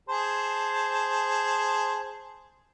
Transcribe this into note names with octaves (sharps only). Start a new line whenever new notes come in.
G#4 C5 A5